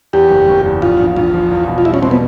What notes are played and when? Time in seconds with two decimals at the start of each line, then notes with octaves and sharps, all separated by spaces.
0.13 E2 G4
0.30 F#1
0.48 F#1
0.66 E2
0.82 A#1 F4
1.00 A#1
1.16 A#1 F4
1.34 F3
1.51 E2
1.68 B2
1.78 F4
1.85 G3 E4
1.94 C#4
2.02 B2 C4
2.11 B3